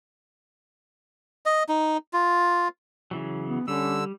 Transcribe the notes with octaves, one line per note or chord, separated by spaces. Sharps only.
D#5
D#4
F4
C#3 E3 F#3
B3
D3 G3 C#4 E6